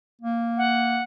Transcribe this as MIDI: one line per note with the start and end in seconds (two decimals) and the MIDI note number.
0.21 1.01 58
0.57 1.03 78